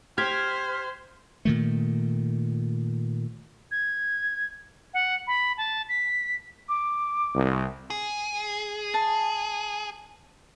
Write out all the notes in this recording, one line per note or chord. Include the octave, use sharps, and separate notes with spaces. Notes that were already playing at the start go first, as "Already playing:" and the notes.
G4 C5 F6 G#6 B6
A#2 D#3 A3
G#6
F#5
B5
A5
B6
D6
C2
G#4
A5